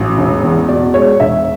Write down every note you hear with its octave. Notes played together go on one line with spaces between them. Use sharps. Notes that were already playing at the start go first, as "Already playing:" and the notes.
Already playing: A1 F#3
E1
E2
B2 D5
G#3 C#5
E1 E5